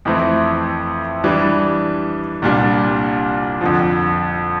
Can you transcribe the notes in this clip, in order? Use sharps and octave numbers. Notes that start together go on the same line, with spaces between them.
F2 E3 A3 C4 E4
E3 G3 D4
C2 A#2 G3 D4
F2 D3 F3